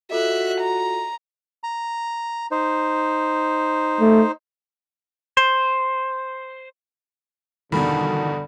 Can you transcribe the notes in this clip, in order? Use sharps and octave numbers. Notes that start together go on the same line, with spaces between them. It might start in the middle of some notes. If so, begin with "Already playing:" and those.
F4 F#4 A4 D#5 E5 F#6
A#5
A#5
D#4 C5
A3
C5
E2 G2 B2 D3 D#3 B5